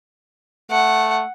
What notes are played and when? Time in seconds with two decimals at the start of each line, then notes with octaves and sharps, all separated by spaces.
0.71 A3 F#5